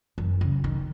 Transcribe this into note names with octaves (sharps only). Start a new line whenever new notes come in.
F#2
C#3
D#3